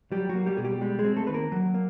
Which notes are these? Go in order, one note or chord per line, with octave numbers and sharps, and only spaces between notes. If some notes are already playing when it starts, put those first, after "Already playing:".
F#3 G3 G4
F#3 F#4
A#3
G3 G4
B2 G#4
G3 G4
G3 G#3 G4
G#3 G#4
C4
A3 A4
D#3 B4
A#3 A#4
F#3
A#3